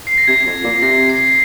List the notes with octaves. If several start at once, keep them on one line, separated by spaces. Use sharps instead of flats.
C7
A#6
C3 G#6
F2
A#2
C3 A#6
C7